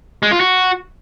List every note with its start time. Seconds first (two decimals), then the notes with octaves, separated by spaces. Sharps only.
0.23 G#3
0.31 F4
0.40 F#4